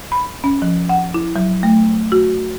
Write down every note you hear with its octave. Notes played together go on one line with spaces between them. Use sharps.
B5
C#4
F3
F#5
E4
F#3
A3
F#4